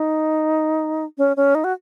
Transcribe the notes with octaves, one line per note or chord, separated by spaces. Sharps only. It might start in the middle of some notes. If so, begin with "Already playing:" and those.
Already playing: D#4
C#4
C#4
D#4
F#4